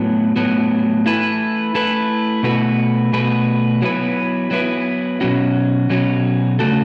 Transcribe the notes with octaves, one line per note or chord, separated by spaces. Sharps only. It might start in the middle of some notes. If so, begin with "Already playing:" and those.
Already playing: A2 F#3 B3
A2 F#3 B3
A3 E4 B4
A3 E4 B4
B2 A3 F#4 B4
B2 A3 F#4 B4
F#3 B3 E4 B4
F#3 B3 E4 B4
B2 F#3 C#4 F#4
B2 F#3 C#4 F#4
C#3 A3 F#4 A4